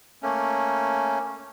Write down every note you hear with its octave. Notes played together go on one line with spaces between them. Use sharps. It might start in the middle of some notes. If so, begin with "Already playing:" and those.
A3 A#3 C#4